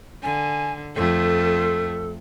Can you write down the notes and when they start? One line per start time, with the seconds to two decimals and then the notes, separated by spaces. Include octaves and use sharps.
0.23 D3 G#5
0.95 F2 A3 A4